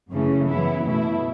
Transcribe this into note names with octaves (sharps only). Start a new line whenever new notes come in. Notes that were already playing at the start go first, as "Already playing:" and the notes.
F#2 C#3 E3 A3 C#4
F#2 E3 B3 E4
B2 A3 E4